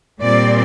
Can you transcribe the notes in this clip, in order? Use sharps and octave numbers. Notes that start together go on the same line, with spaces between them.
A#2 G3 C4 D5